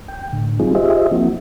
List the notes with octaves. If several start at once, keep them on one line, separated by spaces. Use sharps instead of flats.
G5
A2 D3
F#3 G3 C4 D#4 F4 G#4
F4 G4 G#4 C5 D#5 E5
F3 A#3 C4 E4 F#4